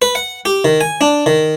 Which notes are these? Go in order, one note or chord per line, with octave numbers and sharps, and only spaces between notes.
B4
F#5
G4
D#3
G#5
D4
D#3